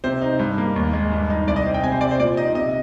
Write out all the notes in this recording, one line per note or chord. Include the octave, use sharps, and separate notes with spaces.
C3 C5
D#4
G2
A#3
D#2
G#3
G2
D#4
C2 D5
D#5
C4
G5
C3 G#5
C5
C3 D5
C5
A#2 D5
D#4 D#5
C3 D#5